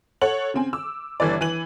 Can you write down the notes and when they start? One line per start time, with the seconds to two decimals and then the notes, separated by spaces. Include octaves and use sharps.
0.21 A4 C#5 F#5 F#7
0.54 C#3 C4 G#5
0.73 D6 E6
1.20 G1 E3 B4 D5
1.41 E3 D#7 F#7